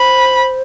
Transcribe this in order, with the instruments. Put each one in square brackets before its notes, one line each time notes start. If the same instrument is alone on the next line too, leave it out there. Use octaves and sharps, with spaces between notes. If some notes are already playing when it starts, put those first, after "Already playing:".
Already playing: [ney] C5 [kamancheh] B5